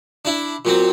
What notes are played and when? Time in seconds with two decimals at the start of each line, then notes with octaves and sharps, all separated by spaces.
0.25 D4 E4
0.65 A#2 F#3 C4